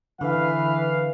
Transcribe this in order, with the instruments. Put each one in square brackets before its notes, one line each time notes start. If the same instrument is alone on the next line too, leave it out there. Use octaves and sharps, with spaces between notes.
[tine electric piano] D3 [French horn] E3 [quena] B4 [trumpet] F5